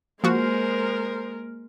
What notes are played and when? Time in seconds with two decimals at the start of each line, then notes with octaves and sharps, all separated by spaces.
0.24 F3 G#3 A#3 F#4 A#4 C5 F6